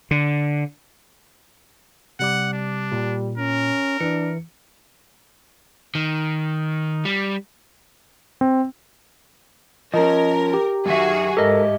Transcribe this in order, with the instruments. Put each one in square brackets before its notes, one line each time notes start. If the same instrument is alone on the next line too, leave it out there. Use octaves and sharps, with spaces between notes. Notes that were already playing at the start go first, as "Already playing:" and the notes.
[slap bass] D3
[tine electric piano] C3 G3 D6 [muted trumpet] F#5
[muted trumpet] D4
[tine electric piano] A#2 [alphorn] G3
[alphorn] C#4 [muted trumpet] A#4
[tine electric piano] E3 C#7 [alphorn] D4
[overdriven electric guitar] D#3
G3
[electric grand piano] C4
[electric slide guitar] F3 C#4 [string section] A#4 [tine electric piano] D#5
[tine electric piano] G4
[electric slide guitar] F#2 E5 [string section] D#3 F#4 G#4
[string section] G#2 [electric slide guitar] G4 D#5 E5 [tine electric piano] A4 A#4